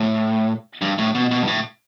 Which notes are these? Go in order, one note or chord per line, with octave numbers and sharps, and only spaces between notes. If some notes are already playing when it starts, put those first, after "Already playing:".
Already playing: A2
G2
A2
B2
B2
G2
A2